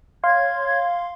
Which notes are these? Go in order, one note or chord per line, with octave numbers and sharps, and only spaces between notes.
C#5 F5 C6 G#6